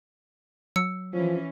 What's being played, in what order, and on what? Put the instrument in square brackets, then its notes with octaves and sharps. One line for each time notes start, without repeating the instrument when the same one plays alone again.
[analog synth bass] F#3 [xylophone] E6 C#7
[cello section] E3 C#4 [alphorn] F3